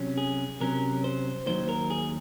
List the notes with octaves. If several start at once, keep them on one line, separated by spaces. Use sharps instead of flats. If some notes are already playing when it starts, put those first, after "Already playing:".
Already playing: C3 F#3 C#4
G#4
C3 F#3 C#4 A#4
C5
D#2 D#3 F#3 C5
A#4
G#4